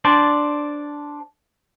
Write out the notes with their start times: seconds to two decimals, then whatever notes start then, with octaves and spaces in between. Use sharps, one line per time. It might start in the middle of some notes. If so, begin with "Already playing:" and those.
0.05 D4 C5 D5